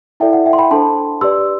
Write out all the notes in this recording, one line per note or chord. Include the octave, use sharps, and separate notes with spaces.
E4 A4 D5 E5 G5
F#5
E5 G5
C6
G5 B5
D4 A4 C5 A5 C6
G4 B4 D5 C6 E6